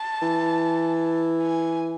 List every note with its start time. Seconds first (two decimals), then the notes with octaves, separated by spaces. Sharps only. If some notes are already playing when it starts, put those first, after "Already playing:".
Already playing: A5
0.22 E3
1.42 G#5